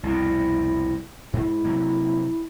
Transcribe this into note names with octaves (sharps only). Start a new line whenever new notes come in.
C2 F2 B2 E4
G#2 E4
C3 F#3 A#3